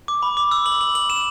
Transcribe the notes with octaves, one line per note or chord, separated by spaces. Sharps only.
D6
B5
D6
E6
F#7
F#7
F#7
E7